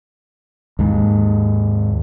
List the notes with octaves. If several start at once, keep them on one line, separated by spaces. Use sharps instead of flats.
D#2 G#2